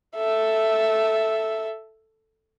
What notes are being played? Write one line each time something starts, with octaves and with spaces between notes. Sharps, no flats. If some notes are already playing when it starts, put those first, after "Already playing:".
A4 E5